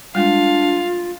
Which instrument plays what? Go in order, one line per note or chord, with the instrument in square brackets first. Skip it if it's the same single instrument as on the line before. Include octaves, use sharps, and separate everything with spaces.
[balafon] G3 G#3 [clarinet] D4 [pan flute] F4 [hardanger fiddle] F5